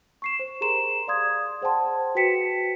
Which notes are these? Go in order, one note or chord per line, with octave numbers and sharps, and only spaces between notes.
C#6 C7 E7
C5
G4 G#4 A#4 A#5 C6 E7
D5 F5 C6 D#6 G#6
G#4 C5 F#5 G5 A5 C6
F#4 B4 G5 B6 C#7 E7